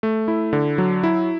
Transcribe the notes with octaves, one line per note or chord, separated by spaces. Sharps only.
A3
E4
D3
F#3
E4